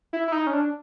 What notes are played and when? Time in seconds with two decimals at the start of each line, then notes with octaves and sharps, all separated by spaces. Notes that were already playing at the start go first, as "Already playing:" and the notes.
0.13 E4
0.28 E4
0.32 D#4
0.47 C#4
0.53 D4